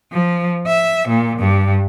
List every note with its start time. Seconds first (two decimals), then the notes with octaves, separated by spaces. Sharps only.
0.12 F3
0.67 E5
1.09 A#2
1.39 G2